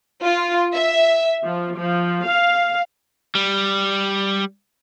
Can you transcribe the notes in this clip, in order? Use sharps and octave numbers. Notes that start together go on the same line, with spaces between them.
F4
E5
F3
F3
F5
G3